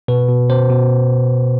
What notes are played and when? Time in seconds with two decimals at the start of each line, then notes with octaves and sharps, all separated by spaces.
0.08 B2 B4
0.29 B2
0.50 B2 C5
0.70 B2